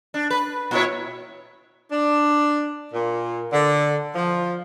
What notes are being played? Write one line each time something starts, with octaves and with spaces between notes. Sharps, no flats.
D4
B4
A#2 E4 C#5
D4
A#2
D3
F3